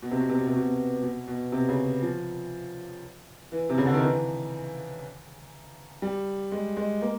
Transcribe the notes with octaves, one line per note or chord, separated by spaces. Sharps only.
B2
C3
B2
C3
B2
C3
B2
B2
B2
C3
C#3
F3
E3
C3
C#3
D3
D#3
E3
G3
G#3
G#3
A#3